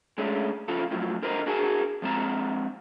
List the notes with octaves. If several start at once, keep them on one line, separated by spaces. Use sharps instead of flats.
G#3 A3 C#4 D4
C#3 F3 F4 A4
F#2 A2 F3 F#3
D3 A#4 C5 D#5 A#5
D4 F#4 G#4 A#4 G#5 A5
F3 G#3 B3 C4 A5 A#5